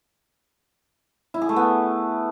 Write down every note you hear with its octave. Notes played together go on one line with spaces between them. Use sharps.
E4
G#4
A3
B3